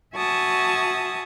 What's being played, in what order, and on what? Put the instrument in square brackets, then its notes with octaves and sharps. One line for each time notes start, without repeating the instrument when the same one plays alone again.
[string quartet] F#4 E5 G#5 A5 C#6 D#6